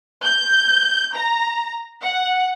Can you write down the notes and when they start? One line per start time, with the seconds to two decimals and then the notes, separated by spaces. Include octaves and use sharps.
0.23 G6
1.14 A#5
2.01 F#5